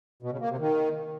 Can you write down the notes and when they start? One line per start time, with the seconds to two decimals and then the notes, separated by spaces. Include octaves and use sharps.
0.23 B2
0.32 C#3
0.41 A#3
0.50 C3
0.59 D#3